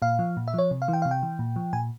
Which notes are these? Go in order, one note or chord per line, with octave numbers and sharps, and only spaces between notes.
A#2 F5
F3
A#2
E5
F3 C#5
C3
F5
E3
G5
C3 F5
G5
E3
A#2
F3
A#2 G#5